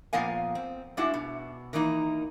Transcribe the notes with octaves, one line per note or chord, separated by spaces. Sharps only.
A#2 F3 B3 D#5 F5 G#5
C4
G2 G#3 D4 E4 F#4
B2
D#3 E3 A#3 D#4